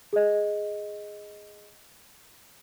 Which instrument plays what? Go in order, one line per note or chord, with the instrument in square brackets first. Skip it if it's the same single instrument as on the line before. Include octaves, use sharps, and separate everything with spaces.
[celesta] G#4 D#5